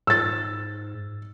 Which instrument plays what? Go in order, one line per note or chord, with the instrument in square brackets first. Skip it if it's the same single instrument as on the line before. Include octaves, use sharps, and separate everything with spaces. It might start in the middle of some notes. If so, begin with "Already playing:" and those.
[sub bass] G#2 [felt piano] E6 A6